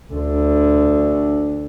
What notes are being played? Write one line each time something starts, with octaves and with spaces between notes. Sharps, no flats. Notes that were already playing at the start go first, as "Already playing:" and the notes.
D2 D3